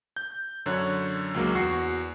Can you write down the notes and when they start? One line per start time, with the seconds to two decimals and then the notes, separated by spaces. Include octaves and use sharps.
0.17 G6
0.66 F#2 D3 C#5 F#6
1.34 C#2 C#3 F#3 A#3
1.55 E2 F#4 C#6 C7